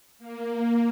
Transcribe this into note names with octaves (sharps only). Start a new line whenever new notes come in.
A#3
A#3